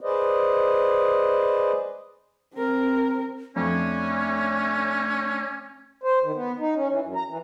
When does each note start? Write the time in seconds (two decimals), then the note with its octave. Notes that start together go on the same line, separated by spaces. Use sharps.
0.01 G#4 B4 C5 D5 D#5
2.54 C4 A#4
3.56 F2 A3 C#4 D4 C#5
6.03 C5
6.23 D#3
6.35 B3
6.60 D#4
6.76 C#4
6.89 E3
7.02 F#2
7.16 A#5
7.29 E3